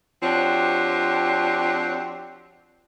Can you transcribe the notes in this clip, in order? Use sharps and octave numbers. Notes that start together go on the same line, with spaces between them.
F3 C4 D4 F#4 G4 C#5